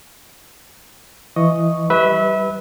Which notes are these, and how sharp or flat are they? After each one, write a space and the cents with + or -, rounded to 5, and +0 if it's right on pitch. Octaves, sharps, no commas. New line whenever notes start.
E3 +15 D#5 +0 C#6 +0
G3 -20 B4 +0 E5 -30